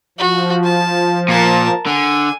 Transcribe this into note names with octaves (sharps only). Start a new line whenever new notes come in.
F3 F#4
A5
A#2 A#4 A5
D3 G#5